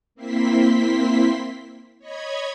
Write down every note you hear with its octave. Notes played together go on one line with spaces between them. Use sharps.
A#3 C4 E4 C6 B6
C#5 D#5 B5 G#6